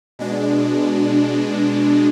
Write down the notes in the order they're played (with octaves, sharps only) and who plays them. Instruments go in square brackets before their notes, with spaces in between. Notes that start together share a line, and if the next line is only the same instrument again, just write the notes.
[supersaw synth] B2 G#3 D4